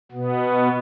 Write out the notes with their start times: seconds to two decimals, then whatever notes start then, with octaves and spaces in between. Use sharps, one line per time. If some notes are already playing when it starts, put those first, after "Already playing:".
0.12 B2 B3